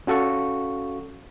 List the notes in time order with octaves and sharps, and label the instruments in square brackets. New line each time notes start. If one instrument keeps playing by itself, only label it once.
[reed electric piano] C#4 F#4 A4 F5 C#6